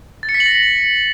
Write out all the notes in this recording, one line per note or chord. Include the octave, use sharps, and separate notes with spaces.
A6
C#7
B6
F#7
A#6